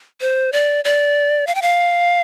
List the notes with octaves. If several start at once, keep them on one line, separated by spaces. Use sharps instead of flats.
C5
D5
D5
F5
G5
F5